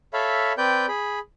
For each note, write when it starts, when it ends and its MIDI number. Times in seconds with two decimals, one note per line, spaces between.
0.13 0.53 69
0.13 0.53 73
0.13 0.53 76
0.13 0.53 77
0.13 0.53 83
0.58 0.86 60
0.58 0.86 71
0.58 0.86 74
0.58 0.86 79
0.58 0.86 91
0.88 1.19 68
0.88 1.19 83